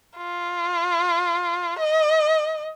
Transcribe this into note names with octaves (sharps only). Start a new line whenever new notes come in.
F4
D#5